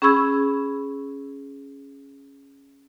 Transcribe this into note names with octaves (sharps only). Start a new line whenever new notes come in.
C#4 G#4 B5 C#6 E6 G#6